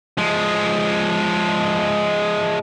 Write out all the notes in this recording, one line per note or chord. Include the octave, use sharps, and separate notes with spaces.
F3 G#3